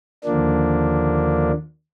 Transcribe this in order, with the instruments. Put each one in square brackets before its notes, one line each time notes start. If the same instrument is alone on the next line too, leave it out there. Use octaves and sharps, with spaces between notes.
[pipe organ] D#2 D3 F3 A#3 D4